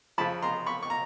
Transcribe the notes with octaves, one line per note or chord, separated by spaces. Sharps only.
F2 C#3 F3 A5 B5
A#5 C6
B5 C#6
C#6
A#5